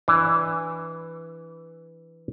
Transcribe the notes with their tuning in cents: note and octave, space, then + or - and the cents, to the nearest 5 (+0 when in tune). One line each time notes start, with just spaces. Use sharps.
E3 +0 D4 +0